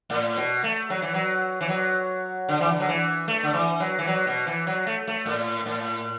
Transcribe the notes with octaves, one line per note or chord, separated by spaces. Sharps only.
A2
B2
A3
F#3
E3
F#3
E3
F#3
D3
E3
D3
F#3
E3
A3
D3
E3
F#3
E3
F#3
B2
E3
F#3
A3
A3
A2
A2